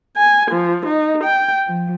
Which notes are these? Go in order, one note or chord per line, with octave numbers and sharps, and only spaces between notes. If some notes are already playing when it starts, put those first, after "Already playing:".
G#5
F3
D#4
G5
F3